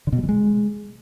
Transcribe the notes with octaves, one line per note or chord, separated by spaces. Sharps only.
D3
B2
G3
E3
G#3